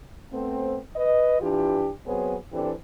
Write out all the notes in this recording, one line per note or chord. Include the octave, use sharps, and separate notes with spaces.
A3 B3 C4
B4 D#5
E3 D4 F4 G4
F#3 B3 C4 G#4 C#5
E3 C4 D4 G4 A4